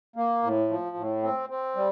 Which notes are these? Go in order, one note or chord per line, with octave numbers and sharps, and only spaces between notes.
A#3
A2
F3
A2
C4
C4
G3